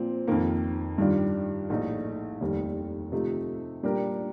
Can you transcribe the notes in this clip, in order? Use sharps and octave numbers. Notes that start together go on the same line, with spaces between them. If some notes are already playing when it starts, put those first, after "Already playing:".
Already playing: A#2 F3 C4
F2 D#3 A#3
G2 D#3 G3 D4 F4
A#1 A2 A3 D#4
F1 D#2 D#3 G3
C3 F3 A3 D#4
A#2 G3 D4 G4 A#4